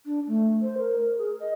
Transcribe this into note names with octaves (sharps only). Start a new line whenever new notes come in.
D4
A3
C5
A#4
G#4
D#5